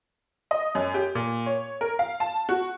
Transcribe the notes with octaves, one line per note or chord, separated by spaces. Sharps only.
D#5
F#2
G4
A#2
C#5
A#4
F5
A5
F#4